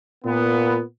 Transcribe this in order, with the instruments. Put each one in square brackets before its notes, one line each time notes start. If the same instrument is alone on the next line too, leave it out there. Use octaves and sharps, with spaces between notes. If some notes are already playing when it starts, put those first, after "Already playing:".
[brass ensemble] A#2 B3